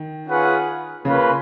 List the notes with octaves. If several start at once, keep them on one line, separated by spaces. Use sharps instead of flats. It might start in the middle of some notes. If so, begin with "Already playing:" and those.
Already playing: D#3
C#4 F4 G#4 B4 F#5
C#3 A#3 C#4 F4 B4